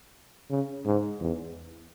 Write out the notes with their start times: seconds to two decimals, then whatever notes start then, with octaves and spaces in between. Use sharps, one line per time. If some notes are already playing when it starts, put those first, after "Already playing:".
0.50 C#3
0.85 G#2
1.21 E2